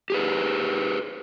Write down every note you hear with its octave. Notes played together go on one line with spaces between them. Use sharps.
G4 G#4 B4